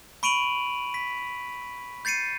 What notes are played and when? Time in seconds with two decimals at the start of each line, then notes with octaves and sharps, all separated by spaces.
0.23 B5 C#6 D7 D#7 F7 F#7
0.94 B6
2.05 G6 A6 C7 C#7 D#7